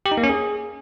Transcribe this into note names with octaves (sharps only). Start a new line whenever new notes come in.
G4
D#4
A#3
C#4
G#4